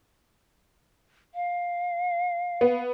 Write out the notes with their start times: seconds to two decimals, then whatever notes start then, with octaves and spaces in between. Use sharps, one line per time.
1.34 F5
2.61 B3